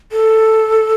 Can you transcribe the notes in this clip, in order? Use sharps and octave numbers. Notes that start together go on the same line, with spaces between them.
A4